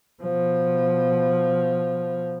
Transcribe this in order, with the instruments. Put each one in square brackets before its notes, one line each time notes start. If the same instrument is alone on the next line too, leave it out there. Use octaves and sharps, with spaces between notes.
[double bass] B2 F3